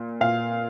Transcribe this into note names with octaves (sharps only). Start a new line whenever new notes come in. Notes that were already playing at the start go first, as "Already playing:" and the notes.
Already playing: A#2
A#2 F5